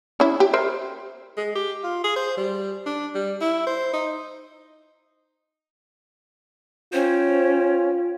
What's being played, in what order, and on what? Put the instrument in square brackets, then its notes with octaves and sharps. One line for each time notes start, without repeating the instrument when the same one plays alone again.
[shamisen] C#4 E4
G4
A#4 C5 E5
[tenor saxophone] G#3
G4
F4
G#4
C5
G3
D4
G3
E4
C5
D#4
[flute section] C#4 C#5 G5 [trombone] F4 [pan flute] C5